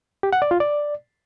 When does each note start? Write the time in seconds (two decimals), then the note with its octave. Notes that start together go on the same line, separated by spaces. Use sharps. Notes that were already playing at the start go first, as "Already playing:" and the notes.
0.23 G4
0.33 F#5
0.42 D5
0.51 F4
0.60 D5